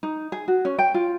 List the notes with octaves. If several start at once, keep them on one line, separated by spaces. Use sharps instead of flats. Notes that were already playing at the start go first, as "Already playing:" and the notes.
D#4
G#4
F#4
C#4
G5
F4